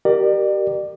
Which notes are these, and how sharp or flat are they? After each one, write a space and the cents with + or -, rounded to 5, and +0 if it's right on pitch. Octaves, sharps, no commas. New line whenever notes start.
G4 -25 A#4 +0 D5 +35